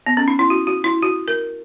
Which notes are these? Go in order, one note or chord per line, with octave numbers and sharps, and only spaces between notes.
B3
C#4
D#4
E4
F#4
F#4
E4
F#4
A#4